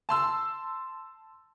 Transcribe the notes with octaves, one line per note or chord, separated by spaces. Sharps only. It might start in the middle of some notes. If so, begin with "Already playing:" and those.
A5 C6 E6